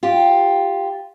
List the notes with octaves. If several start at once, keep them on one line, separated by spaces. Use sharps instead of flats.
F4 G4